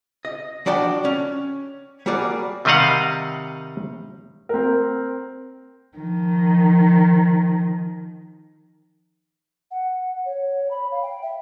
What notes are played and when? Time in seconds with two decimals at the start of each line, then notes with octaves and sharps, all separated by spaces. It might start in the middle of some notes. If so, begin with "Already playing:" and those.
0.25 D#5
0.66 F3 D4 F#4 D5 G5
1.05 C#4
2.06 G3 A#3 F#4 G#4 D5
2.65 C3 D#3 G3 D#5 F5 F#5
4.49 C4 A#4
5.98 D#3 F3
9.71 F#5
10.25 C#5
10.71 B5
10.91 F5
11.03 G5
11.22 E5